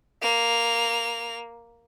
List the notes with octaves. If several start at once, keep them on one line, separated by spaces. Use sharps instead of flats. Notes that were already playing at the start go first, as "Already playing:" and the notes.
A#3 F7